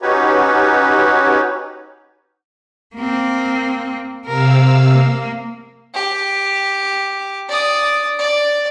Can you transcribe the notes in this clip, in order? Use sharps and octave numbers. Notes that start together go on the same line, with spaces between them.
C#4 D#4 F#4 G4 B4 C#5
A#3 C4
C3 A#4 F5 E6
A#3
G4
D5 D#6
D5